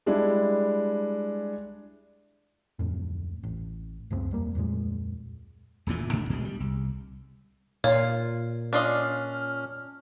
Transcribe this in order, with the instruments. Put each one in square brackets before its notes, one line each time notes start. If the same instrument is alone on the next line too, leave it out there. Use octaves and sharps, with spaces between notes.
[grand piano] G3 G#3 D4 E4
[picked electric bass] D1 F2 A2
A1
C#2 F#2 A3 C4
E1 G3 A#3
D1 F2 A#2 G#3
[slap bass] D#1 D2 A#2 E3
G#2 D#3 D4
A#1 D#2 B2 G#3
G3
C2
[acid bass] A#2 [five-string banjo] F4 [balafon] C#5
[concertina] C#4 F6 [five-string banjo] D4 F4 D#5